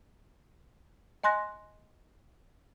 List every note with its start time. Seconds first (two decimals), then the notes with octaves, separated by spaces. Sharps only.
1.23 D#5 G#5 C6 F#6 A#6